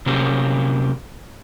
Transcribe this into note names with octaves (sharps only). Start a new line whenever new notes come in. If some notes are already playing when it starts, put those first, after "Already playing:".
C3 F#3 A#3 C#4 G4